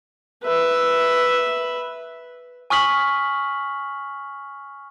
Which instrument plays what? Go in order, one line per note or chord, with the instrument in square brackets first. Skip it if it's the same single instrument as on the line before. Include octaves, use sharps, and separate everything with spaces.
[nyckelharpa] B4 E5
[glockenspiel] G#5 C#6 D#6 F6 B6 F#7